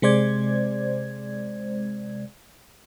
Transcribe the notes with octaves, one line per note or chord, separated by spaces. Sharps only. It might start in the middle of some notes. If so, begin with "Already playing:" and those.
C3 G#3 C5 D5 G#6